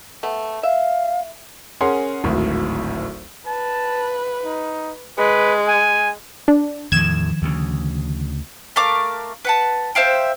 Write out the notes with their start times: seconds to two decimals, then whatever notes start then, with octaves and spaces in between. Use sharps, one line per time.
0.23 A3 B3
0.63 E5 F5
1.81 C#4 G#4 A#4 F#5 G#5 C6
2.24 D1 G#1 D2
3.47 B4 A5
4.45 D#4
5.18 G#3 B4
5.68 G#5
6.48 D4
6.92 E2 A2 D#3 F3 G#6 E7
7.42 D2 C#3
8.76 A3 A#4 F5 D6
9.45 B4 F#5 A5
9.95 C5 E5 F5 G5